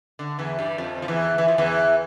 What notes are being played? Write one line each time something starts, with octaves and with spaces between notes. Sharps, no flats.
D3
E2 E3
G2 G3
F2 F3
F3
E2 E3
E3
F3
E2 E3